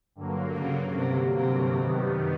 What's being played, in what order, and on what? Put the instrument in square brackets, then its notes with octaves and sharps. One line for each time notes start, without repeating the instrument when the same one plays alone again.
[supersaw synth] G2 D3 F#3 A#3
[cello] C#3
C3
C3
[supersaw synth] F#2 D#3 G3 B3